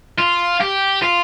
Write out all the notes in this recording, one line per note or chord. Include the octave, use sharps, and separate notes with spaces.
F4
G4
F4